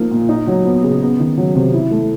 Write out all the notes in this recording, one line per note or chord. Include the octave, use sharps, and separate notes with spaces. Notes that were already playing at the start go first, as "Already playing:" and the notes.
Already playing: F3 A#3 D#4
A#2
D#4
F#3
B3
C#3
B3
D#3
F#3
C3
E4
A3